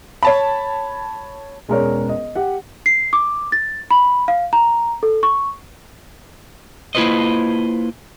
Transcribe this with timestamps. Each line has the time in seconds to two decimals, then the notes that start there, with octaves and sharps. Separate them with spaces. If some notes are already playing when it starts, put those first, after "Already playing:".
0.23 C#5 A5 B5
1.69 E1 G#3 C#4 A#4 C#5 D5
2.09 D#5
2.36 G4 F#5
2.86 C7
3.13 D6
3.52 A6
3.91 B5
4.28 F5
4.53 A#5
5.03 A4
5.23 C#6
6.95 A#3 E4 F4 B4 C5 D#5